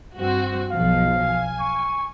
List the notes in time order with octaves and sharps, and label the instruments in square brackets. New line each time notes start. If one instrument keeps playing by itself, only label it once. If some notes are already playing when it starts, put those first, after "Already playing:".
[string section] G2 C4 F#4
[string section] B1 F3 [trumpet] F5
[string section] G#5
[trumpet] C#6